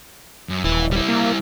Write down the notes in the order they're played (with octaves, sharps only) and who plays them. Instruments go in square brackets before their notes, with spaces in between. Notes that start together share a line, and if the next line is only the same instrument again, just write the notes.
[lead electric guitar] F#2
[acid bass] D#1 [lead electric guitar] E4 B4
[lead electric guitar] G3 E4
[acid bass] A#3